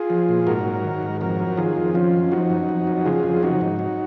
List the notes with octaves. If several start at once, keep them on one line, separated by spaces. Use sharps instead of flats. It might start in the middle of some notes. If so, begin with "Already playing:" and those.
Already playing: F4 G#4
F3
A#2
G#2 F#4 A#4
F#3
D#3
G#2
F2 F#4 A#4
F#3
D#3 F4 G#4
F2
F3 C#4 F4
F#2
F3 D#4 F#4
F#2
F2
F#3
C#3 F4 G#4
F2
F#3 D#4 F#4
G#2
F#3